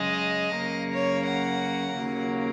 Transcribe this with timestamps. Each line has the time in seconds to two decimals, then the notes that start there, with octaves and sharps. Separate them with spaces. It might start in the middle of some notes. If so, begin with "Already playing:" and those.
Already playing: F#2 C#3 G#3 D#5
0.58 F#2 C#3 A#3
0.93 C#5
1.27 F#5
1.96 D#2 C#3 F#3 A#3